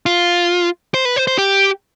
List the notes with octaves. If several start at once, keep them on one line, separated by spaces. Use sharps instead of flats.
F4
C5
B4
C5
C5
G4